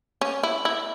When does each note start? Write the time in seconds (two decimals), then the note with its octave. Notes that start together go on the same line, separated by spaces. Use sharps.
0.21 C#4
0.43 E4
0.65 E4